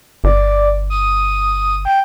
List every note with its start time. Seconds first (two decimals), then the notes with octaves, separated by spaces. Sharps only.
0.24 G1 D5
0.90 D#6
1.85 G5